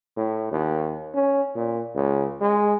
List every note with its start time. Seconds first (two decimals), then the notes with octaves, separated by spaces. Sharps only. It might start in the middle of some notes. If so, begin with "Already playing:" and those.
0.17 A2
0.52 D#2
1.15 C#4
1.55 A#2
1.95 C#2
2.41 G#3